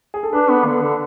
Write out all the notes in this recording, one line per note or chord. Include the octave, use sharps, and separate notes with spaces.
G#4
A4
D4 B4
B3
D3
D3